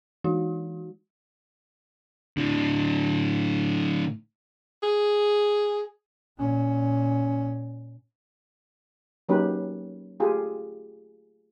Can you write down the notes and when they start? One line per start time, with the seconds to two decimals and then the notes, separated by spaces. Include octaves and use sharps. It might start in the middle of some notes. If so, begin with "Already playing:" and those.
0.24 E3 G#3 D#4 F#4
2.37 A2 D3
4.83 G#4
6.39 A#2 C#4
9.29 F#3 A#3 C#4 D#4 G4 B4
10.20 A3 F4 G4 G#4